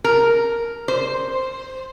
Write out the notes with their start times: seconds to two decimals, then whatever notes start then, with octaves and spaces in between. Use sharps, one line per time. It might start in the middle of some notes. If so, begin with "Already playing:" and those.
0.04 A#4
0.88 C5